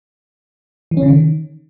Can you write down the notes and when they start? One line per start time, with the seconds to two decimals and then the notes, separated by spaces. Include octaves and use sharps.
0.91 E3
0.97 C#4
1.03 C#3
1.08 D#3